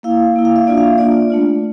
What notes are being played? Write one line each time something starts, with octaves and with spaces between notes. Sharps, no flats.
A#3 E4 F5
A#3 E4
F5
E5
A#3 D4 F4 D5
F5
E5
A#3 D4 F4 D5
A3 D4 F4